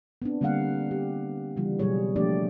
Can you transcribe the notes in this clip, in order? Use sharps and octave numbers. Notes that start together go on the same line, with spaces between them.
B3 C4 D4
D3 G3 A#3 C4 F5 F#5
G4
C#3 E3 G3 F4
B2 F#3 G3 G#4 C#5
F3 A3 A#3 D4 G4 D5